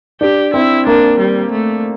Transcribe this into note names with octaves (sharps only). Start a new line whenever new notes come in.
D4 G4
C4 E4
A#3 D4
G3
A3